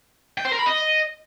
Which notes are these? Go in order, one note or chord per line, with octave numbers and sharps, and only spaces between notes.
G5
C5
A#4
B5
D#5